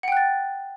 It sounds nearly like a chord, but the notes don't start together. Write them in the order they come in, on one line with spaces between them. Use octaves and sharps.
F#5 G5 F#6 A6